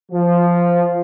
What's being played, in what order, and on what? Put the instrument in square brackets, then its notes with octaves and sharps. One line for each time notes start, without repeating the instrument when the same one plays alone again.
[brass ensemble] F3